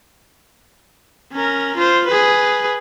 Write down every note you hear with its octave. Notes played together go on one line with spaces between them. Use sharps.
C#4 A#4
F4 C5
G#4 B4